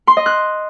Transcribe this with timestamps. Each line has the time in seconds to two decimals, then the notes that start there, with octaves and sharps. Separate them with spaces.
0.07 C6
0.17 D#5
0.26 F#6